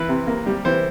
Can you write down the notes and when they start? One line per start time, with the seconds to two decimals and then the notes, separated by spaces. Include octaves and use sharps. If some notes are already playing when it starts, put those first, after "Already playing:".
Already playing: E3 B4
0.09 C3
0.27 A#3
0.46 G3
0.65 E3 C5